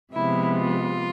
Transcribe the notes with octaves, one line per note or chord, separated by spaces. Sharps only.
C3 F3 G#3 B3 E4
F4